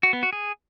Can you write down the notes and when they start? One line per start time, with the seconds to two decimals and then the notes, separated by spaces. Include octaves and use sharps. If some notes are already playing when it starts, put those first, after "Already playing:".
0.03 F#4
0.13 B3
0.23 F#4
0.33 G#4